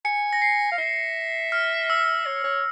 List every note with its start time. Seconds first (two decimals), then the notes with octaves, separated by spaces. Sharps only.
0.05 G#5 C#7
0.33 A#6
0.42 C7
0.72 F5
0.78 E5
1.52 F6
1.90 E6
2.26 C#5
2.44 C#5